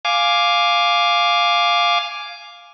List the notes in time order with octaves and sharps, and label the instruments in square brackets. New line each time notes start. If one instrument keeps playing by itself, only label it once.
[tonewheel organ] F5 G#5 D6